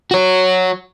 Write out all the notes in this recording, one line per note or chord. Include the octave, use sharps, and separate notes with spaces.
F#4 C#5